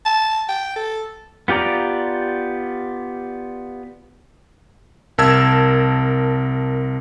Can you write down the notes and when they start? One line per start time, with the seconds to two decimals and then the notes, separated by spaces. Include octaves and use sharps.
0.05 A5
0.48 G5
0.76 A4
1.48 B3 F4 G4 D5 A#5
5.18 C2 A#4 A5 E6 G#6